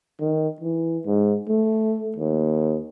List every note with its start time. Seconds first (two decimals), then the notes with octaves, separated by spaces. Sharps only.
0.20 D#3
0.60 E3
1.05 G#2
1.48 A3
2.16 D#2